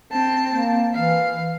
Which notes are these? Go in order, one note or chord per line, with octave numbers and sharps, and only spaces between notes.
C4 A5
A#3
E3 F5